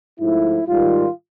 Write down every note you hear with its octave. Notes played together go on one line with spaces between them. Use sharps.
G#2 F3 A3 E4
G#2 D#3 G3 F4